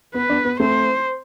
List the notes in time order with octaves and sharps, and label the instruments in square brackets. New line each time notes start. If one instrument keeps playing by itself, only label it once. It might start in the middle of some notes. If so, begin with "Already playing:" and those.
[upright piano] B3 [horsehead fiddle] B4
[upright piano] B3 D4
B3
[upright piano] A3 C4 [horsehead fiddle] C5